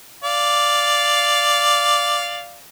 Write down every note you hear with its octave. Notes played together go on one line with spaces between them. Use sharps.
D5 F5